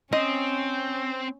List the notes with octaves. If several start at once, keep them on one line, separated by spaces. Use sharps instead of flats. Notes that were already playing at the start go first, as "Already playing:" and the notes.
C4 C#4 D#5